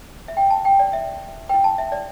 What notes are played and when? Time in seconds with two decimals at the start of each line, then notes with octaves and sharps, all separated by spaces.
0.28 E5
0.37 G5
0.50 A5
0.65 G5
0.79 D5
0.93 E5
1.49 E4 B4 G5
1.64 A5
1.78 E5
1.92 D5